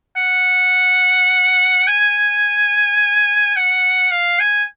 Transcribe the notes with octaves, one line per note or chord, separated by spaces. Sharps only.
F#5
G#5
F#5
F5
G#5